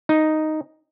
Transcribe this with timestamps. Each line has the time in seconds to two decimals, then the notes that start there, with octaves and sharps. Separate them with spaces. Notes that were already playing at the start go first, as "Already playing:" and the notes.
0.09 D#4